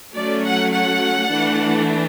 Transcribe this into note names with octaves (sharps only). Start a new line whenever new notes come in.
F#3 A3 C#4 D5
F#5
F#5
E3 A3 D4